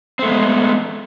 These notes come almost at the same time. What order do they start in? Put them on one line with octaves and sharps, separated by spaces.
C4 A3 B3 G#3